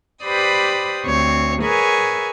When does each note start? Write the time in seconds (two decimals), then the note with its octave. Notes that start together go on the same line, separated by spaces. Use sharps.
0.23 G4 B4 C5 D5 B5 D#6
1.04 D2 C4 C#5
1.61 G#4 A#4 B4 C#5 E5 G#5